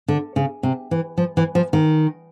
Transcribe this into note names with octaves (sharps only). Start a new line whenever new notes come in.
D3
C#3
C3
E3
F3
E3
F3
D#3